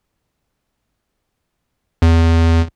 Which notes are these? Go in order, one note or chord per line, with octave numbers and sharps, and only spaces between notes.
E2